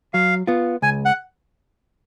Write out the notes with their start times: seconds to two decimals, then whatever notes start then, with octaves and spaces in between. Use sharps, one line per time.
0.14 F#3 F5
0.47 B3 F4
0.82 C#2 G#5
1.05 F#5